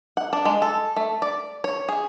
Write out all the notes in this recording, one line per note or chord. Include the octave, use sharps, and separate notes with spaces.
F#5
D4
G#3
A4
A3
D5
C#5
G#4